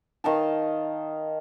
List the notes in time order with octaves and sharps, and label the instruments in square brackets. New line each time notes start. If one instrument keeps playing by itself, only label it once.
[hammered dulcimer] D#3 D#5 F5 A5